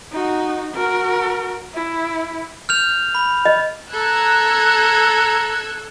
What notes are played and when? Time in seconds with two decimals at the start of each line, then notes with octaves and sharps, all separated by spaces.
0.12 D#4 F#4
0.74 F#4 A#4
1.74 E4
2.69 F6 G6 F7
3.15 B5
3.45 D#5
3.93 A4 A#5 E6 F#6 G#6